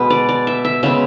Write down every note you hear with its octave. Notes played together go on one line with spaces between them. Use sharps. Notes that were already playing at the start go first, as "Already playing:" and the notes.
Already playing: B2 G#3 B3 B4
D5
D5
E5
E5
C#3 G#3 B3 E5